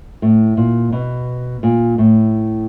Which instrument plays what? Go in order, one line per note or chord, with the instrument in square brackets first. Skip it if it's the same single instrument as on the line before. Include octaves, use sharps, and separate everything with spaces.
[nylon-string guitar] A2
A#2
B2
A#2
A2